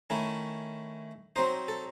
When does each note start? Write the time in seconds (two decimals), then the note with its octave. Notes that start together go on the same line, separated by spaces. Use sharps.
0.10 D#3 A3 C#4 E4
1.36 F#3 C4 D#4 C5
1.68 A4